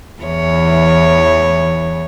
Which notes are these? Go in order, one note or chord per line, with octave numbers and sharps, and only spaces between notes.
E2 E3 C#5